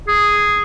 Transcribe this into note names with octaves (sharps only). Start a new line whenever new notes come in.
G#4